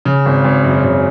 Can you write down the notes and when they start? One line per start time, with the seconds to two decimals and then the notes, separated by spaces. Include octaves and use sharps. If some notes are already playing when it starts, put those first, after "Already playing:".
0.05 C#3
0.26 G#1
0.44 G#1
0.64 F#2
0.84 C#3